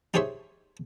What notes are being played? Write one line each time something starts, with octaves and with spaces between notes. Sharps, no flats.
D#4 G4 G#4 C5 C#5 E5